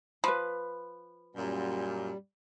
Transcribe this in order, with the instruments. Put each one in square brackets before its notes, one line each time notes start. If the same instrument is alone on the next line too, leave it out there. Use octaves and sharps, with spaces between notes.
[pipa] F3 [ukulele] B4 B5
[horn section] F#2 A#2 [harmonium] G3